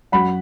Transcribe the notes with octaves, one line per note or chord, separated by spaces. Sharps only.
F#2 F#3 F#5 B5